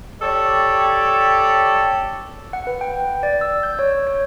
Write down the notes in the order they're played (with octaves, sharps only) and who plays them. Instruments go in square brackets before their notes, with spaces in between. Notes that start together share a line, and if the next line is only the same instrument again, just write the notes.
[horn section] G4 A4 C#5 D5
[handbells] F#5
B4
G5
D5
E6
G6
C#5
C#5